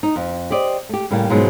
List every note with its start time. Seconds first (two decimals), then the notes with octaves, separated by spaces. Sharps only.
0.03 D#4
0.16 F2
0.50 G4 C5 D5 D#5
0.89 A3 G4
1.11 A2 C#3 G3 A#3
1.30 G#2 B2 F3 F#3 G#3 A#3